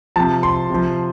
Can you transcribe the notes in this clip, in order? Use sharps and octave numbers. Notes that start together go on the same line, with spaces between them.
C3 F3 A5
C6
C3 F3